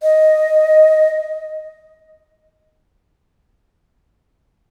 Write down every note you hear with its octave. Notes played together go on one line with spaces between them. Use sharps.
D#5